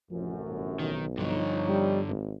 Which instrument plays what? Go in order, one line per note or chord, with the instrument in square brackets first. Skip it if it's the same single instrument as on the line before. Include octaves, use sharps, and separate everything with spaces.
[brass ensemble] A1 F#2 C3 [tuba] F3
[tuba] G1
[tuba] B1 [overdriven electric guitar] D#3
[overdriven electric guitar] G2 D3 [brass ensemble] F3 D#4 C#5
[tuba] G3
G#1